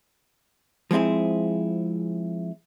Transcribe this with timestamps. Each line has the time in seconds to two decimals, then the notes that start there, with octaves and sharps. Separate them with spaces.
0.91 F3 G#3 C4 E4 G#4